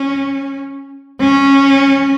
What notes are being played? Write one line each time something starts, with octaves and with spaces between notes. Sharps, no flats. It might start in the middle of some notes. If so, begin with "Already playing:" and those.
Already playing: C#4
C#4